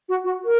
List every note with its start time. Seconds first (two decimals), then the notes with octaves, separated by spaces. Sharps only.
0.08 F#4
0.24 F#4
0.44 A#4